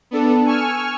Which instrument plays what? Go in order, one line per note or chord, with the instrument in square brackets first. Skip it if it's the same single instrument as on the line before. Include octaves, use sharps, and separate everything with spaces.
[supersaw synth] B3 D4 A4
G#5 C#6 E6 F6